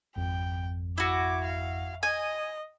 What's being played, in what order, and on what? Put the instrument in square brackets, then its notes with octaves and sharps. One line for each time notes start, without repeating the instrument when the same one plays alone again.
[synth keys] G#1 F2 [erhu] G5
[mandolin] E4 F#4 [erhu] D6
[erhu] F5
[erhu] D#5 [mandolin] G#5